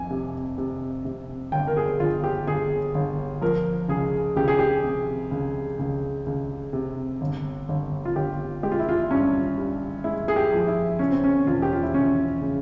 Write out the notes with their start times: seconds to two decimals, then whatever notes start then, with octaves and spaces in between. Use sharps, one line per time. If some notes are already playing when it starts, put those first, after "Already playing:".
Already playing: F2 G#5
0.10 C3
0.58 C3
1.05 C3
1.52 G1 G5
1.67 A#4
1.77 G#4
1.99 G1 F4
2.24 G4
2.47 G1 G#4
2.94 G1
3.42 F3 A#4
3.89 C#2 G#4
4.36 C#2 G4
4.48 G#4
4.59 G4
4.84 C3
5.31 C#2
5.79 C#2
6.26 C#2
6.73 C3
7.21 G1
7.69 G1
8.05 F4
8.16 G1 G4
8.63 G#3 G4
8.72 F4
8.79 E4
8.89 F4
9.11 G2 C#4
9.58 G2
10.04 G#3 E4
10.28 G#4
10.36 G4
10.52 F3
10.67 E4
10.99 C#3 C#4
11.12 C4
11.24 C#4
11.47 E1 F4
11.62 G4
11.73 F4
11.83 E4
11.94 E1 C#4
12.41 C#3